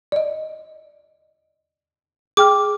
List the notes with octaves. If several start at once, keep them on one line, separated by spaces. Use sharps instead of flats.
D5 D#5
G#4 G5 D6 F6